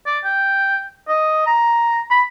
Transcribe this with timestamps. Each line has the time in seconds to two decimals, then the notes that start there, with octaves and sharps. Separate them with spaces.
0.06 D5
0.24 G5
1.08 D#5
1.46 A#5
2.10 B5